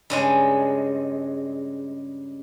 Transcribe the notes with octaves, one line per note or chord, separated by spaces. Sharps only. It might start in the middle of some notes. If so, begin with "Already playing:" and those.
G2 C#3 G#3